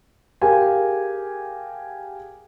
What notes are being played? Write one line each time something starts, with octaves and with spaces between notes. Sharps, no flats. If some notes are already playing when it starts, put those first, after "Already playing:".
G4 G#4 A#4 F5 G#5